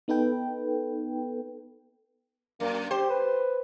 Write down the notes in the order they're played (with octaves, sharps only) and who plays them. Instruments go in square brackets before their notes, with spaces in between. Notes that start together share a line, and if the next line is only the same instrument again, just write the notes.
[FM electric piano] B3 D#4 A4 B4 G5
[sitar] F#2 [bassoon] A#3
[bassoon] G4 [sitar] C5
[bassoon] B4